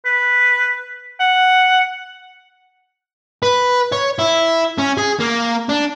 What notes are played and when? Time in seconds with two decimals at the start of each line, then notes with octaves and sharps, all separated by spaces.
0.05 B4
1.20 F#5
3.43 B4
3.92 C#5
4.19 E4
4.78 C#4
4.97 G#4
5.20 A#3
5.69 D4